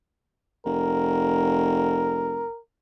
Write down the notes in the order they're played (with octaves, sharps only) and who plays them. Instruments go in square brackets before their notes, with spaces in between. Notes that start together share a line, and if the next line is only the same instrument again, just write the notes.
[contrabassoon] F1 [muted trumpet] A#4